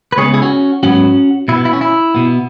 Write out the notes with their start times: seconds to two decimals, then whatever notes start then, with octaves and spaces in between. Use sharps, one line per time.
0.12 B4
0.18 C#2 C#3 G#3 B3 G#4 C#5
0.34 E4 G#4
0.42 C#4 F#4
0.83 G#2 F#3 B3 C#4 F#4
1.48 B2 E4
1.52 B3
1.65 E4
1.73 C#4
1.81 E4
2.14 B2 B3